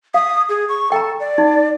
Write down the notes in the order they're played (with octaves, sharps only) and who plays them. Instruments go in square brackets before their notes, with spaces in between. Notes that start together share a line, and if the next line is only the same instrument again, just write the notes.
[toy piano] F5 [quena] D#6
[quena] G#4
C#6
[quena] A4 [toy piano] G5 A#5
[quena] D5
[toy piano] D#4